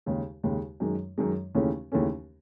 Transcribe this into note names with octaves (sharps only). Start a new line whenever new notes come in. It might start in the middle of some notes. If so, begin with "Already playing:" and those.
D#2 C#3 G#3
D#2 C#3 G#3
F#2 D#3 G#3
F#2 D#3 G#3
D#2 C#3 E3 A3 C#4
D#2 C#3 E3 A3 C#4